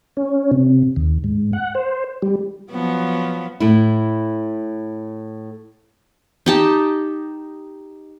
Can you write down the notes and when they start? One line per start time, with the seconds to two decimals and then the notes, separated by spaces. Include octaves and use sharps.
0.17 C#4
0.51 C3
0.96 D#2
1.24 G#2
1.53 F#5
1.75 C5
2.22 G3
2.71 F3 F#3 B3
3.60 A2 E4
6.46 D#4 G4 A5